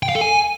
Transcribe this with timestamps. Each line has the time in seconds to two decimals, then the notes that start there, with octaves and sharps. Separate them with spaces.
0.03 G5
0.09 F5
0.15 A4
0.21 G#5